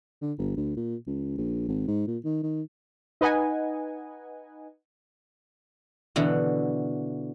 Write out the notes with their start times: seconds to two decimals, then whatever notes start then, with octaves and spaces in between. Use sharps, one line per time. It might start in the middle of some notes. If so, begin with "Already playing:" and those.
0.22 D3
0.38 G1
0.57 D2
0.77 A#2
1.07 C#2
1.37 A#1
1.68 G#1
1.88 G#2
2.07 A#2
2.25 D#3
2.43 D#3
3.21 D#4 B4 D#5 F#5 G#5
6.16 B2 D3 E3